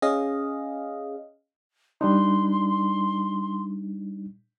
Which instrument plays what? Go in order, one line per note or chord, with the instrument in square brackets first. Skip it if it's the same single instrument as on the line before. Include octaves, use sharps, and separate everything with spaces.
[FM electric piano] C#4 G#4 D#5 F5
[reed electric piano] G3 D4 D#4 [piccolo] C6